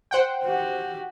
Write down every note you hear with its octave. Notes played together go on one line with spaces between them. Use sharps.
C5 F#5 G5
F#4 G4